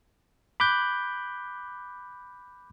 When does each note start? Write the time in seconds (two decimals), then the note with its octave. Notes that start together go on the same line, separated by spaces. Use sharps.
0.60 B5 D6 F#6 G6